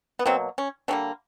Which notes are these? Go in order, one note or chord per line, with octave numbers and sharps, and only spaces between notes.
B3
B2 F#3 A#3 C4
C#4
D3 G3 A#3 C#4